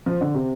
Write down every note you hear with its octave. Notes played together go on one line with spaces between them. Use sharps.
F3
D3
C3